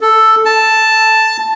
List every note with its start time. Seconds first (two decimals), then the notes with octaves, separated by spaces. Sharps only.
0.01 A4
0.45 A5